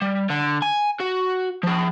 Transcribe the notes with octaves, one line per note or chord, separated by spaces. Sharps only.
G3
D3
G#5
F#4
F3 G#4